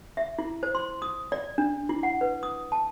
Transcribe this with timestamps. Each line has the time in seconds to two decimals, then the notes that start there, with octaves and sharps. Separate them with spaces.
0.17 E5
0.39 E4
0.63 C5
0.75 C6
1.02 D#6
1.32 D5
1.58 D4
1.89 E4
2.03 F#5
2.21 B4
2.43 D#6
2.72 A5